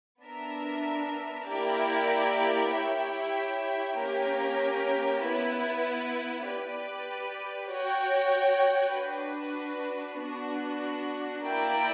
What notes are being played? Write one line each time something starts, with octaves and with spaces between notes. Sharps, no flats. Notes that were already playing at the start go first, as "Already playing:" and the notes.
B3 D4 A#4 E5
A#3 E4 G4 A#4 D5
E4 G4 C#5 E5 G5
A#3 C#4 G4 A#4
B3 E4 B4
G4 B4 D5
F#4 C#5 G5
D4 F#4 B4
B3 D4 F#4
A#3 E4 A#4 D5 G5